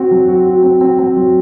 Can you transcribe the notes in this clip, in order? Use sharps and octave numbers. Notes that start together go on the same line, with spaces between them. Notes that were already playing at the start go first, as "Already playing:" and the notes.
Already playing: C4 F#4
F#3
F#4
F#4
C4
C4
C4
F#3